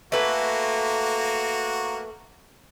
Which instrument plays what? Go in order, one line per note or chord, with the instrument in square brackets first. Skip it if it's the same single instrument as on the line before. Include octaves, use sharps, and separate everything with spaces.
[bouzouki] A3 B4 G#5 [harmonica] A#3 F#4